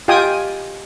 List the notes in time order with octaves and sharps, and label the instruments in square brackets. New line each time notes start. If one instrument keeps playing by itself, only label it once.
[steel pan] F4 G4 D#5 G5 G#5 D#6